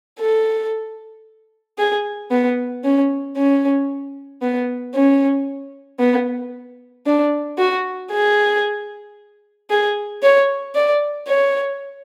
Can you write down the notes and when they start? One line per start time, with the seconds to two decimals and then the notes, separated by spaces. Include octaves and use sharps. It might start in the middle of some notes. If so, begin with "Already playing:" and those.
0.19 A4
1.78 G#4
2.31 B3
2.84 C#4
3.36 C#4
4.42 B3
4.94 C#4
6.00 B3
7.06 D4
7.59 F#4
8.12 G#4
9.70 G#4
10.23 C#5
10.75 D5
11.28 C#5